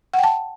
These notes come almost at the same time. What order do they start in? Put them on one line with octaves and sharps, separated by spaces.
F#5 G5 A5